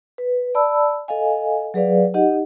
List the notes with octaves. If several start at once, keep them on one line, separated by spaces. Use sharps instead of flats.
B4
D5 A5 B5 E6
A4 D#5 F5 G#5
F#3 G#4 B4 D5 F5
D#4 G4 D#5 F#5